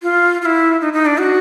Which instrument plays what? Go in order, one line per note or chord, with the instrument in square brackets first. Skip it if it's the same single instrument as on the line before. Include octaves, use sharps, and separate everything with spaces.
[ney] F4
F4
E4
D#4
D#4
D4
F#4